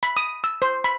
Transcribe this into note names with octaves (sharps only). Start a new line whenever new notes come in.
B5
D#6
E6
C5
B5